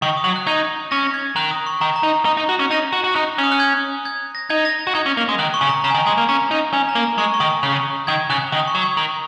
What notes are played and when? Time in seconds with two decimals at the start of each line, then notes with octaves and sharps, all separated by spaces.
0.02 D#3 C#6
0.17 D#6
0.24 F#3
0.36 F#6
0.47 D#4 G#6
0.91 C#4 A#6
1.03 A#6
1.14 G#6
1.36 D#3 F#6
1.51 D#6
1.66 C#6
1.81 D#3 A#5
1.96 A#5
2.03 D#4
2.25 D#4 A#5
2.37 D#4
2.49 F#4
2.59 C#4
2.71 D#4 A#6
2.92 F#4
3.04 F#4
3.15 D#4 F#6
3.38 C#4
3.44 D#6
3.52 F#6
3.60 G#6
4.05 G#6
4.35 A#6
4.50 D#4 G#6
4.65 A#6
4.79 A#6
4.87 F#4
4.95 D#4 G#6
5.06 C#4
5.17 A#3
5.29 G#3 D#6
5.39 D#3 F#6
5.54 C#6
5.61 C#3
5.69 A#5
5.84 C#3 A#5
5.91 G#5
5.94 D#3
6.06 G#3 G#5
6.18 A#3
6.29 C#4 A#5
6.51 D#4
6.73 C#4 G#5
6.89 A#5
6.95 A#3
7.03 A#5
7.18 G#3 C#6
7.34 C#6
7.40 D#3 D#6
7.63 C#3 F#6
8.07 D#3 G#6
8.30 C#3 F#6
8.52 D#3 D#6
8.67 C#6
8.75 F#3
8.82 G#6
8.97 D#3